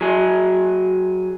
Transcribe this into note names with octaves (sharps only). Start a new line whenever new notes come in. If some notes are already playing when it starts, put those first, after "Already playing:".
F#3 G#4